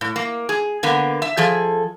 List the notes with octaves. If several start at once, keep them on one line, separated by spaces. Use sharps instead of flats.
A2
A#3
G#4
D3 A#3 B3
E5
F3 G#4 A4